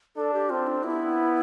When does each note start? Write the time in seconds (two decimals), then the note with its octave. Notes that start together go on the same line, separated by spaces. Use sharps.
0.16 D4 A4
0.34 G4
0.50 C4 F4
0.67 D4
0.83 B3 E4